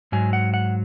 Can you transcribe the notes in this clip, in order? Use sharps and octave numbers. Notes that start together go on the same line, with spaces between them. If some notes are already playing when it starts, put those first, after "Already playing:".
G#2 F#3 G#5
F#5
F#5